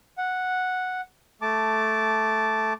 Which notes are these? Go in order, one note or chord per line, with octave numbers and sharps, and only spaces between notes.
F#5
A3 A5 D6